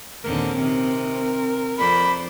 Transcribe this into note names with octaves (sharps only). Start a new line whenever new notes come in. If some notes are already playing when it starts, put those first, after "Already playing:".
A#1 D#2 D3 C4 C#4 A#4
C3 D#3 C4
F2 C5 D5 B5